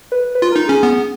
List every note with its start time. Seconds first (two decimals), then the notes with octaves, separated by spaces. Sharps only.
0.12 B4
0.35 B4
0.42 F4
0.52 A#4
0.56 D#4
0.67 C#4 G#4
0.83 B3